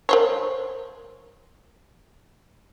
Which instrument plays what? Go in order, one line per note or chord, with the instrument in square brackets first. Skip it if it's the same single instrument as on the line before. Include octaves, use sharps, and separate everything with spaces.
[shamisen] A#4 C5 C#5